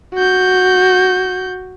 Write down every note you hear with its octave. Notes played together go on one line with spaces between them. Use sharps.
F#4 G6